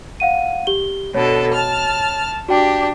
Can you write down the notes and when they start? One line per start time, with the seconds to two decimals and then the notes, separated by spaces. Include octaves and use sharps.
0.20 F5 F#5 D#7
0.67 G4 G7
1.14 B2 D3 A4 C#5
1.53 A5 F6
2.49 D4 F#4 G4 G5